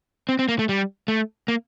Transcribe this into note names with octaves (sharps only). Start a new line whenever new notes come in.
C4
C4
A#3
A3
G3
A3
A#3